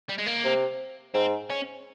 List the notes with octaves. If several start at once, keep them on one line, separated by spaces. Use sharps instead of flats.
G3
G#3
A#3
C3
G#2 C4
C#4